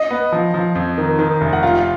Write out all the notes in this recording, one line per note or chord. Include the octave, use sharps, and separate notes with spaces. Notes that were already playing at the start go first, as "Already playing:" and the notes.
Already playing: D#5
B3
F3
F3
F2
D#3
D#3
F1
F#5
F4 F5